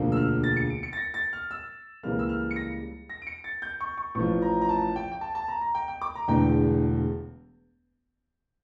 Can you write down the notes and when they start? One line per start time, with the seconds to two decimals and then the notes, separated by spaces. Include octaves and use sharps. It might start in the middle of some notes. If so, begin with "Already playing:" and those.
Already playing: E1 D2 D3 F3 A#3
0.12 E6
0.17 F6
0.44 A6
0.57 C#7
0.70 D7
0.83 C#7
0.93 A6
0.97 A#6
1.14 A6
1.33 F6
1.51 E6
2.03 C#2 C#3 E3 G3 A#3 F6
2.19 E6
2.29 F6
2.51 C#7
2.56 A#6
3.09 A#6
3.22 D7
3.27 C#7
3.44 A6
3.62 G6
3.80 C#6
3.97 C#6
4.15 A1 A2 F3 C#6
4.42 A#5
4.61 A#5
4.69 A5
4.96 G5
5.12 G5
5.21 A5
5.35 A5
5.48 A#5
5.61 A#5
5.75 G5
5.88 G5
6.01 D6
6.15 A#5
6.28 E1 E2 D3 A3 G5